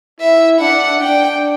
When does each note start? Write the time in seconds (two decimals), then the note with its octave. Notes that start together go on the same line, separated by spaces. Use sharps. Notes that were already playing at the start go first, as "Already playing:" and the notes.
0.21 E4 E5
0.60 D4 F#5
1.00 D4 G5